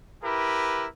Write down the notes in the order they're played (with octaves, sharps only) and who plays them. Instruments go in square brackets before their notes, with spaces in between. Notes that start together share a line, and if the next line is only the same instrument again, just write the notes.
[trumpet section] E4 G4 A#4 B4